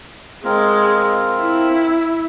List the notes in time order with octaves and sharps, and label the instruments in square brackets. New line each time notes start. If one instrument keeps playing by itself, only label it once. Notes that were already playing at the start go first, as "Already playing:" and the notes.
[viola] G#3 [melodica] C4 F4 A#4
[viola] E4